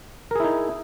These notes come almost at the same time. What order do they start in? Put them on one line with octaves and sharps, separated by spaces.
A#4 G#4 E4 D#4